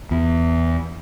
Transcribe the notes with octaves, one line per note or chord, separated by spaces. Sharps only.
E2